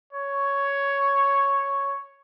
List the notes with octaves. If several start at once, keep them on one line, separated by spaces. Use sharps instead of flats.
C#5